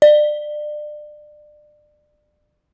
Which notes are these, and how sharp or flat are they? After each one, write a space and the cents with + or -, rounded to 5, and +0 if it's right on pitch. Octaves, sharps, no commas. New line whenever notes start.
D5 +30